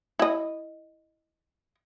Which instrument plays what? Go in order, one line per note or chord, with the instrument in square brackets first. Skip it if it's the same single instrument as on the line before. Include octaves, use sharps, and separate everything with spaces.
[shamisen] E4 D#5